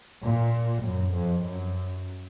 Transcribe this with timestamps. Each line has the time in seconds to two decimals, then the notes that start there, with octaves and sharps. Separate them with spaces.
0.22 A#2
0.84 F#2
1.14 F2
1.44 F#2